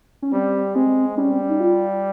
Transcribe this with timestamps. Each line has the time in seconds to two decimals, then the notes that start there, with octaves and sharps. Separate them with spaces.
0.22 C#4
0.32 G3 C4
0.75 G#3 C4
1.17 G3 C#4
1.31 C4
1.41 C#4
1.50 D#4
1.60 F4